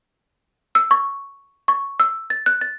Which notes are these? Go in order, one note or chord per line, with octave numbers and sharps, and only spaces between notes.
E6
C#6
C#6
E6
A6
F#6
A6